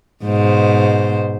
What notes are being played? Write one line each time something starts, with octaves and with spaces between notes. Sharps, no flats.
G#2 B2 C5